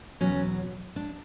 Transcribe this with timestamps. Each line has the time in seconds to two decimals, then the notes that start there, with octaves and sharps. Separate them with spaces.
0.21 E2 B2 F#3 C#4
0.96 D4